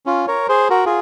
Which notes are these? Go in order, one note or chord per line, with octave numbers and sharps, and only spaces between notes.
C#4 F4
A#4 C#5
G#4 C5
F#4 A#4
F4 G#4